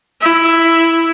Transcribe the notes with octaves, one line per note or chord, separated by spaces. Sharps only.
E4